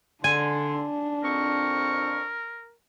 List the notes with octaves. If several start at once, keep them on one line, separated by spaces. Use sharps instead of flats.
D3 D4 G#5 C6
F2 C4 A#4 C#6